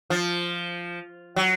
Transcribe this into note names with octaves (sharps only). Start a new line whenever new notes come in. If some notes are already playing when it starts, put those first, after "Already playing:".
F3
F#3